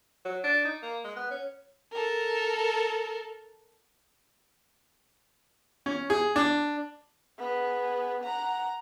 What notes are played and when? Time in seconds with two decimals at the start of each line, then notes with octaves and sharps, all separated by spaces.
0.25 F#3
0.44 D4
0.65 D#4
0.82 A#3
1.04 G#3
1.16 B3
1.30 C#4
1.92 A4 A#4
5.86 C#4
6.10 G#4
6.36 D4
7.39 B3 G#4
8.23 F#5 A#5